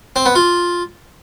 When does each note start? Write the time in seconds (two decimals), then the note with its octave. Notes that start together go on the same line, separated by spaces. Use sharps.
0.16 C4
0.26 B3
0.35 F4